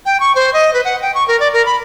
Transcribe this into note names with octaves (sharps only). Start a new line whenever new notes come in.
G5
C#6
C5
D#5
B4
F#5
G5
C#6
A#4
D5
A#4
B5